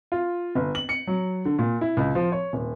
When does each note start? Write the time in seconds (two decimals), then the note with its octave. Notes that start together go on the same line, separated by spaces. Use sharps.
0.12 F4
0.55 G1
0.75 F#7
0.89 C#7
1.07 F#3
1.45 D3
1.59 A#2
1.81 E4
1.97 C#2
2.15 F3
2.32 C#5
2.53 D#1